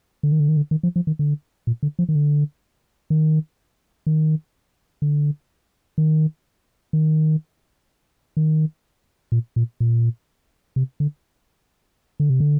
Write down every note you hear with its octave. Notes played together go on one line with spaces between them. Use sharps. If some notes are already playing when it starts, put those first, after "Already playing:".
D3
D#3
D3
D#3
D3
D#3
F3
F3
D#3
D3
A#2
D3
F3
D#3
D3
D#3
D#3
D3
D#3
D#3
D#3
A#2
A#2
A#2
C3
D3
D3
C3
D3